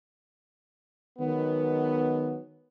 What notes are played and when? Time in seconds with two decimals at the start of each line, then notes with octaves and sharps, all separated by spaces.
1.19 D#3 F#3 G#3 B3